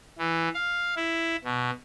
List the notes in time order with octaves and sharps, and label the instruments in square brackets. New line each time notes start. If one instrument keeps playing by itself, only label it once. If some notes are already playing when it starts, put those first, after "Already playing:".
[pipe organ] E3
F5
E4
B2